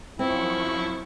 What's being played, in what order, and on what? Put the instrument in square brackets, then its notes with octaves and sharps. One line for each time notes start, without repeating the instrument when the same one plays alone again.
[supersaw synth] F#2 F3 C#6 [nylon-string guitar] C4 [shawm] E4